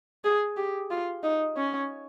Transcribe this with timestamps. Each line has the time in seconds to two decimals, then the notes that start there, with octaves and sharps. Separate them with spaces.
0.24 G#4
0.57 G4
0.91 F4
1.23 D#4
1.57 C#4